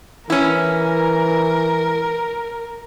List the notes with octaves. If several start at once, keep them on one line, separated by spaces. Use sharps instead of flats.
E3 C#4 E4 A#4